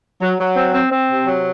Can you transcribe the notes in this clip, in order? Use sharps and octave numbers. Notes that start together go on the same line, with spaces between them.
F#3
F#3
C4
C4
C4
C3
F#3